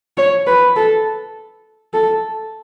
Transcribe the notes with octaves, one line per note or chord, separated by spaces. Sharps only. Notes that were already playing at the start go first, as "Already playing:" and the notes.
C#5
B4
A4
A4